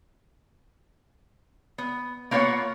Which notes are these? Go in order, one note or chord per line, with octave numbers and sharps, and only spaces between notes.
B3
A#3 B3 F4 C#5 F#5